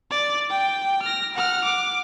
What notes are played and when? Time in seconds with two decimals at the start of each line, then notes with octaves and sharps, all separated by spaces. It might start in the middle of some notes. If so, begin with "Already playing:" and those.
0.11 D5
0.50 G5
1.02 F6 A#6
1.34 F#5 F6
1.64 D6